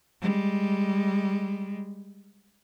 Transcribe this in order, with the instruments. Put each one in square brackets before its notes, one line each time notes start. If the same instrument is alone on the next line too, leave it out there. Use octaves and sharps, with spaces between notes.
[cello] G3 G#3